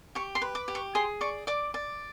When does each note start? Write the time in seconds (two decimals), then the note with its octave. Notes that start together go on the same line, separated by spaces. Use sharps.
0.15 G4 C#6
0.35 C6
0.42 B4
0.55 D6
0.68 G4
0.75 C#6
0.95 G#4 C6
1.21 D5 C#6
1.47 D5 D6
1.74 D5